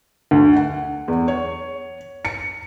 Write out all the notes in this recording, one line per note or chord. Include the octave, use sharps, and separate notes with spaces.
D2
F#5
E2
C#5
C#7